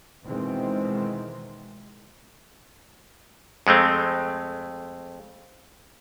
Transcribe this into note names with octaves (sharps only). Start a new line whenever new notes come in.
B2 D#3 E3 G#3 C4
F2 G#3 A3 C4